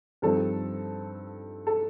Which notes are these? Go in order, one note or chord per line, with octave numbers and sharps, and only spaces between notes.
G2 F3 C4 D#4 A4
A4